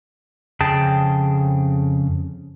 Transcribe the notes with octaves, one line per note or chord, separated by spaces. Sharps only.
F2 C#3 G#4 G5 A5